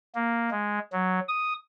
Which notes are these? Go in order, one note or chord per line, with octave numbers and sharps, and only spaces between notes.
A#3
G#3
F#3
D#6